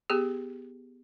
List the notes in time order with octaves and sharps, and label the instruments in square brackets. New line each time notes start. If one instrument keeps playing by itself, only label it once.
[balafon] B3 G4 G#4